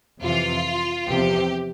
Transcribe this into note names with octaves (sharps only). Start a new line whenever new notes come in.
F2 C3 E3 F4
E2 C3 F3 G4